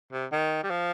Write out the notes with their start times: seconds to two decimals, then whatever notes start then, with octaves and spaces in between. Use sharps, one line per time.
0.13 C3
0.32 D#3
0.63 G3
0.70 F3